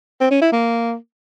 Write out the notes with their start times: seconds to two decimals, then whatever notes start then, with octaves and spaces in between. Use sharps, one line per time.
0.20 C4
0.31 C#4
0.42 E4
0.52 A#3